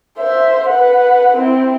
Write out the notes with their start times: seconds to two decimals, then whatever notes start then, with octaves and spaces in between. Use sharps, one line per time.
0.19 C5 E5
0.69 B4 F#5
1.37 C4 E4